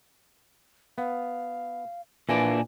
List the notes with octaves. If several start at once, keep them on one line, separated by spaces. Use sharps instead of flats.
B3 F5
A#2 E3 A#3 D4 G#5